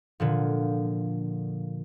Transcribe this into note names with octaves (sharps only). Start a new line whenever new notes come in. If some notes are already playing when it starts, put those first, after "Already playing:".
A#2 D3 F3